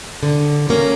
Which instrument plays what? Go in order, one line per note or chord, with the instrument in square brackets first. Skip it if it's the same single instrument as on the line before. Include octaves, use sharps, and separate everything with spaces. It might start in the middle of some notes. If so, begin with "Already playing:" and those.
[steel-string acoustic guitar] D3
F#3 A#3 C#4